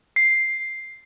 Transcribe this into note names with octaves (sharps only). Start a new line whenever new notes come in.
C7